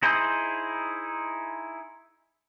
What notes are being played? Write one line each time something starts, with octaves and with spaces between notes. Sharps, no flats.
D#4 E4 G#4 C5